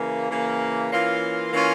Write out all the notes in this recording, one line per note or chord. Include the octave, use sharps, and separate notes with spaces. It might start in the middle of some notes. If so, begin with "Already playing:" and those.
Already playing: C#3 E3 A#3
C#3 E3 A#3
E3 A#3 C#4 F4
E3 A#3 C#4 F4